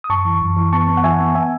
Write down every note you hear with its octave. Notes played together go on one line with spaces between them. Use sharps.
D#6
F#2 A5 C#6
E3
F#2
E3
B3 A5 C#6
B3
F#5
E3 E5 G#5
B3
B3 E5 G#5